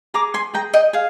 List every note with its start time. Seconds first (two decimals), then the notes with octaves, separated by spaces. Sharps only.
0.14 G#4 A#5 D6
0.34 G#5 C6
0.54 G#4 G5 A#5
0.74 D#5 G5
0.93 G#4 F5